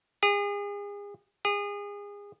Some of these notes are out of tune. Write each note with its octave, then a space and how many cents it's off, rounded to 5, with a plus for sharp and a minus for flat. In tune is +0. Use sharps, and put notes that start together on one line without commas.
G#4 -35
G#4 -30